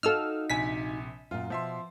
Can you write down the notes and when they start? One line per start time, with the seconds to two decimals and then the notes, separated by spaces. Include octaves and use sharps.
0.03 D#4 F#4 A4 F5 E6 F6
0.50 A#1 C3 G#5 B6
1.31 F#2 A#2 F4
1.50 B2 F3 E5 C6